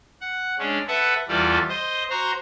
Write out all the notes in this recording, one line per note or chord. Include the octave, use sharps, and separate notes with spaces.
F#5
G#3 C#4 D4
A4 B4 E5 F#5
E2 G3 F4 A4 D5
C5 D#5
F#4 C5 A#5 C6